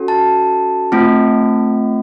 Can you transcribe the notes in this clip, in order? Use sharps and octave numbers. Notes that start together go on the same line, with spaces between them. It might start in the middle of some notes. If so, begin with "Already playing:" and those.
Already playing: C#4 F#4 A4
A5
A3 C4 F4